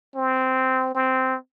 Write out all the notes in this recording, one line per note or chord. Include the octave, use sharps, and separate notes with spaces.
C4
C4